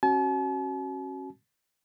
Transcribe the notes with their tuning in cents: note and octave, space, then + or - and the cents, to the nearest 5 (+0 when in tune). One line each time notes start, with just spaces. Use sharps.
C#4 -30 F#4 +10 A5 -45